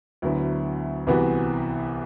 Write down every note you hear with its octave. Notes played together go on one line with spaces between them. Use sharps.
D2 D3 F#3 B3 E4
C2 C3 E3 B3 F#4